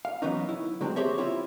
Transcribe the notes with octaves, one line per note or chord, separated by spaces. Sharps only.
F5
E3 F#3 B3 C#4 D#4
E4
D3 F#3 G#3 C4
C4 G4 G#4 C5 C#5 E5
C4 E4 F4 C#5